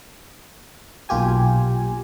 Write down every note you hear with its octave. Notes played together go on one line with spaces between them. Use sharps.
B1 A#2 F4 G4 G#5